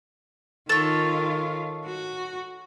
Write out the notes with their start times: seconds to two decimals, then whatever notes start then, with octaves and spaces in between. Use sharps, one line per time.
0.69 D#3 F4 A4 C#5
1.85 F#4